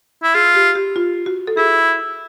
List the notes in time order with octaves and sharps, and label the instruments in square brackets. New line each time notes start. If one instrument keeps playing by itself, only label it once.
[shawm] E4
[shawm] F4 [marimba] G#4
[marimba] G4
G4
F4
F#4
A4
[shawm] E4 [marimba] G#4